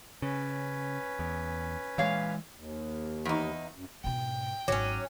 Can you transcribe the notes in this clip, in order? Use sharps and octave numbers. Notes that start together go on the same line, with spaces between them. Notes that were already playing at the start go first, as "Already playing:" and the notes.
C#3 C#4 B4
E2
A#2 E3 F3 G#3 C#5 F5
D#2
E2 D#4
F#2
G#2 B2 G5
G#1 F#3 G#3 C#4 C#5 D6